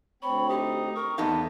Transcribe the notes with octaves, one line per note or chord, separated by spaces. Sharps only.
D2 C4 C#5 B5
D#4 G4
A#4 C#6
E2 D3 B3 D#4 A4 F5 A5